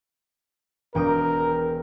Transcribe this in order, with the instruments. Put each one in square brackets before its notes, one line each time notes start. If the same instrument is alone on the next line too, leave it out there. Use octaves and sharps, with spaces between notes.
[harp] E1 G5 D#6 [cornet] A#4